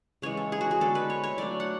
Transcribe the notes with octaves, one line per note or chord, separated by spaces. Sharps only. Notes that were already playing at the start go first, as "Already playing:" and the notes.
C#3 E3 G#3 C#5
A4
G#4
F#4
G#4
D3 G#3 B3 A4
B4
C#5
C#5
F#3 A3 D4 D5
F#5